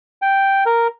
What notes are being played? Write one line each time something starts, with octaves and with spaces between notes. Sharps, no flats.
G5
A#4